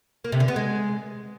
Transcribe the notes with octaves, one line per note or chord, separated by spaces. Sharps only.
A#3
C3
D3
B3
G#3